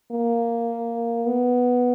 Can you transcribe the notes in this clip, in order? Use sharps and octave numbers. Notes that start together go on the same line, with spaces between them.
A#3
B3